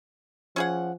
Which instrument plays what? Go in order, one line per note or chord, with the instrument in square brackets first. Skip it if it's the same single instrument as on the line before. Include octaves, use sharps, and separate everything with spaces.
[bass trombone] F3 [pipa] C#4 G#4 F#5